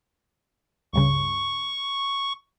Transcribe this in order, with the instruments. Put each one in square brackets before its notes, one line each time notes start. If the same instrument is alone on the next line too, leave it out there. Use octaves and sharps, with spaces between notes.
[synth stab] C#2 G2 C#3 [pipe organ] C#6